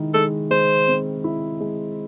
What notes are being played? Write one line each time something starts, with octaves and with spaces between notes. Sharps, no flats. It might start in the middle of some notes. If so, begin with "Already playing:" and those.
Already playing: D#3 G#3 E4
G#3 A4
G#3 C5
C4
E4
G#3